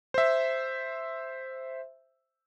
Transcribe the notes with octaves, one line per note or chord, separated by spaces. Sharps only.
C5 E5